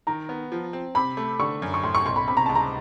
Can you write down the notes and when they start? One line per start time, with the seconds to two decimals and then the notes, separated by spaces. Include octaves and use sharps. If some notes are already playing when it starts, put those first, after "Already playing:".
0.07 D#3 A#5
0.29 B3
0.52 F3
0.73 C4
0.95 C3 B5
1.17 A3
1.40 D3 C#6
1.62 F#2
1.74 C#6
1.83 A2 C6
1.95 C#6
2.06 B1 C6
2.16 B5
2.27 C3 B5
2.37 A#5
2.46 C#2 A5
2.55 A#5